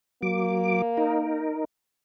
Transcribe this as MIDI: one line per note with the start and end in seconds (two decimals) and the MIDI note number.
0.22 0.82 54
0.22 1.57 58
0.22 0.82 86
0.97 1.65 63
0.97 1.65 70